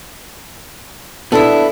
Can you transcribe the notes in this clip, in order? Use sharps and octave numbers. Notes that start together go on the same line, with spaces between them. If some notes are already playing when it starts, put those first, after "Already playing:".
B3 D4 E4 A4